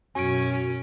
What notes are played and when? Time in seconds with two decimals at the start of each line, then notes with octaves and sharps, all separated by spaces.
0.15 F#2 B2 C#4 F#4 G#5 D7